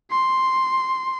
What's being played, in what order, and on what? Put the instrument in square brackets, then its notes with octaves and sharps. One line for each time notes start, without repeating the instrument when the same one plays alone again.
[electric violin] C6